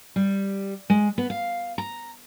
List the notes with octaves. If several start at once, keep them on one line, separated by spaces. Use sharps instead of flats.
G3
G#3
B3
F5
A#5